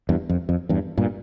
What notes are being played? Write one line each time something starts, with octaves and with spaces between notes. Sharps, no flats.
E2 G2
F2
F2
E2 G2
G2 A#2